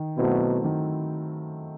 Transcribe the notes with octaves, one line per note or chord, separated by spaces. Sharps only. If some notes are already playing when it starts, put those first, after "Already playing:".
Already playing: D#3
B2 F#3 A3 C4 E4
D#3